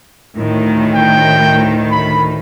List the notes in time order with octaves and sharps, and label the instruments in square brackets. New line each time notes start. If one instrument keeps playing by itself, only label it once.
[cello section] D2 A2 D#3
[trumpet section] G5
B5